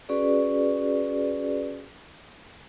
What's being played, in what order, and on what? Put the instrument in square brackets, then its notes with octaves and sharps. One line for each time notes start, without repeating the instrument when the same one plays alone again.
[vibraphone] C#4 F#4 G#4 B4 D5